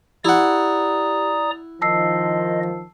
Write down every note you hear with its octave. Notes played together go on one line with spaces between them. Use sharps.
E4 G4 D5 F#5 A#5 D#6
D#3 F3 D#5 A5 E6 C7